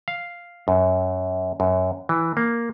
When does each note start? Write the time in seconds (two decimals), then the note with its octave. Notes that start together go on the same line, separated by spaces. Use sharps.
0.08 F5
0.68 F#2
1.60 F#2
2.09 E3
2.37 A#3